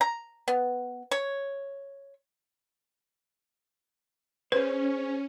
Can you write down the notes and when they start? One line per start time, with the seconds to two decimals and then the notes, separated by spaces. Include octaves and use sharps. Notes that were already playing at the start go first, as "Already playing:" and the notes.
0.01 A#5
0.48 B3
1.11 C#5
4.52 C#4 G#4 B4 C5